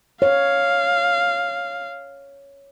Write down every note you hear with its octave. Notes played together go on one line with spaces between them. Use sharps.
C#5 F5